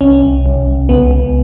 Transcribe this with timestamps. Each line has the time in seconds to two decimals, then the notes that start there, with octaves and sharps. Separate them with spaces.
0.01 C2 C#4
0.23 C2
0.46 C2
0.67 C2
0.89 C#2 B3
1.11 C#2